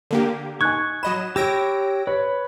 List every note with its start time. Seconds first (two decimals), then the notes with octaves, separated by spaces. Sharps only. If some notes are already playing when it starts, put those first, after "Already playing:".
0.11 D3 A#3 G4
0.61 D#4 G#5 C#6 F#6 G#6
1.03 F#3 D#5 B5 E7
1.36 G4 C#5 E6 A#6 D7
2.07 B4 C#5